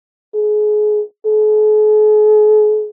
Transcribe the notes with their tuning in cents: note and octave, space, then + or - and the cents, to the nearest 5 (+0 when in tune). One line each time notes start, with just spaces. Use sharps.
G#4 +30
G#4 +45